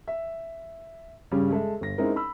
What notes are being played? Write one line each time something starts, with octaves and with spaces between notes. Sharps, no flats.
E5
G2 C#3 G3 C#4
G#3 A4 E5
G1 A#6
G#3 C4 C#4 D#4 E4 A#4
B5 E6